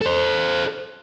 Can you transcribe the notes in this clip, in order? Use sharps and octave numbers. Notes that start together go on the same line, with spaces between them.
A4 C5